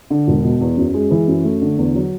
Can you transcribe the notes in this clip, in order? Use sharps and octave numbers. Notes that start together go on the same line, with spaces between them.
D3
E1
B2
E2
F#2
G#3
E3
F#2
A3
D3
E2
F#3